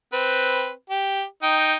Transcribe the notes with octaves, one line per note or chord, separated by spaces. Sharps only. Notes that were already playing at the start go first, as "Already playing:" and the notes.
C4 B4
G4
D#4 G5